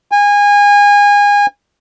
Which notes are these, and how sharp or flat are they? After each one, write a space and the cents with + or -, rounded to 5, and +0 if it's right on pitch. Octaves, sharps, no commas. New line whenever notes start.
G#5 -25